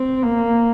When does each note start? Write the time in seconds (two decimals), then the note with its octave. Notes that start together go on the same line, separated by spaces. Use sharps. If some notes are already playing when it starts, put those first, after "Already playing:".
Already playing: C4
0.23 A#3